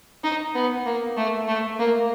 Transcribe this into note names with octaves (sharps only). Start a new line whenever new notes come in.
D#4
B3
A#3
A3
A3
A#3